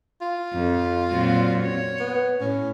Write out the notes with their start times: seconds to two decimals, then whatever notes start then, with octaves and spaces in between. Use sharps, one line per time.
0.21 F4
0.53 F2
1.08 A#2 F#3 C4
1.63 C#5
2.00 B3
2.41 A2 C#4